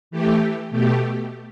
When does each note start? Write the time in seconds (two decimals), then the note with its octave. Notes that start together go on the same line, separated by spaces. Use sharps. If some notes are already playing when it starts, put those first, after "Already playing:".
0.11 E3 A3 G4
0.70 B2 A3 G4